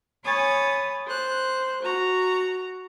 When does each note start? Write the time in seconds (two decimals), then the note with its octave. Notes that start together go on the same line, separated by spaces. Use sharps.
0.24 C#5 G#5 B5 D#6 A6
1.06 C5 F#6
1.82 F#4 A#5